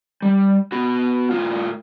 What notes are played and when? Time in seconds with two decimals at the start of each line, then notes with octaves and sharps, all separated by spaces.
0.22 G3
0.72 B3 F#4
1.31 A2 F4